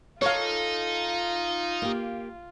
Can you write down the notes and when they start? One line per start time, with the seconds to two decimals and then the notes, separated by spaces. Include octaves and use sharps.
0.22 D#4 F4 A4 C#5 F5
1.82 A#3 G4